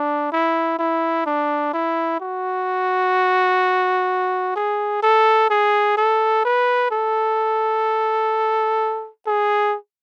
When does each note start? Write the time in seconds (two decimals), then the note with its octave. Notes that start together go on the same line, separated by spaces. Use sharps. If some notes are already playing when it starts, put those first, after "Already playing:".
Already playing: D4
0.32 E4
0.79 E4
1.26 D4
1.74 E4
2.20 F#4
4.56 G#4
5.03 A4
5.50 G#4
5.97 A4
6.45 B4
6.91 A4
9.27 G#4